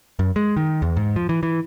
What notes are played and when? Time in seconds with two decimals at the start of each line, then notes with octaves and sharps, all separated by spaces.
0.19 F#2
0.36 G#3
0.57 D#3
0.82 E2
0.97 G#2
1.16 F3
1.29 E3
1.43 E3